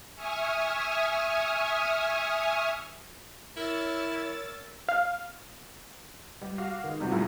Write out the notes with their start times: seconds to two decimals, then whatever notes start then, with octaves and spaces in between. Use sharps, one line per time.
0.15 E5 G#5 C#6 D#6 F6
3.57 E4 A#4 C#5 E6 A6
4.89 F5
6.42 G3
6.58 F#4 F5 D6
6.84 D#3 G#3
7.00 C3 G3 F4 F#4
7.12 F#2 A2 C#3